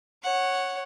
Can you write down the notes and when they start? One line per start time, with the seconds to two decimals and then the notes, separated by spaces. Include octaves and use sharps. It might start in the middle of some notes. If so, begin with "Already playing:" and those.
0.22 C#5 F#5